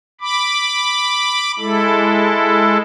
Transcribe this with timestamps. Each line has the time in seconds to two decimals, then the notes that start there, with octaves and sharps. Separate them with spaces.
0.21 B5 D6
1.59 G#3 E4 A4